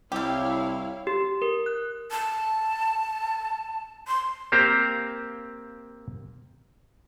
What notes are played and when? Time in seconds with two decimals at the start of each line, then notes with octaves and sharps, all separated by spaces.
0.12 C2 G3 E4 G4 C#5 F5
1.07 G4
1.42 A#4
1.66 F#6
2.11 A5
4.07 C6
4.52 A#3 C4 G4 C5 F5 A#5